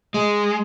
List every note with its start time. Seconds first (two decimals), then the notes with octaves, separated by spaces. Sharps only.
0.14 G#3